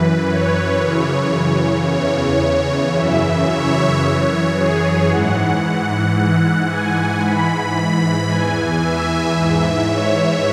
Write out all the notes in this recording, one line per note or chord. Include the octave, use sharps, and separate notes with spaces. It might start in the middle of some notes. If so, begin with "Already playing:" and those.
Already playing: F#2 E3 B4
C#5
F#2 C#3 E3
E2 C#3 E3 C#5
F#2 C#3 E3 E5
C#5
F#2 E3
G#4
G#2 E3 F#5
F#5
G#2 E3
G#5
G#2 E3 B5
E2 E3 G#5
E5
G#2 E3
C#5